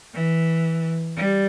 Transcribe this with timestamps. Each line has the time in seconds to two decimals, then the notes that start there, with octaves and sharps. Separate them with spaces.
0.14 E3
1.16 G3